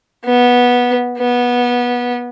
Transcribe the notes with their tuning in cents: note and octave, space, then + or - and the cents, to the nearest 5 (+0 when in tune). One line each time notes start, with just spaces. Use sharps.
B3 -10
B3 -20